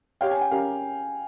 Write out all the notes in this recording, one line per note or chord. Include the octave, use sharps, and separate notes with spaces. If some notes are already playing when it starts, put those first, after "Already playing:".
G4 C#5 F5 G5
G#5
G5
C#4 G4 A#4 F5